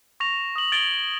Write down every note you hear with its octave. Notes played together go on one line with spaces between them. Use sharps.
C#6 A#6 F7
D#6 F#7
G#6 A6 D7 F7 G7